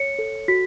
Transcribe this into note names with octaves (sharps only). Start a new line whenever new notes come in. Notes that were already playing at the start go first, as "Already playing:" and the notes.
Already playing: C#5 C#7
A4
F#4 B6